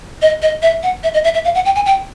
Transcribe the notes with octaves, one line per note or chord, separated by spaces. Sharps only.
D#5
D#5
E5
F#5
E5
D#5
E5
E5
F5
F#5
G5
G#5
G5